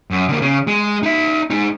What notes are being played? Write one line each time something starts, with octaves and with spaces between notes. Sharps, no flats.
F#2
D3 A#3
C#3
G#3
D#4 E5
G#3 D#4